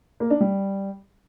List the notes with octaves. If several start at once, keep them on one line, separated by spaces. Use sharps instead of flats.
A#3
D4
G3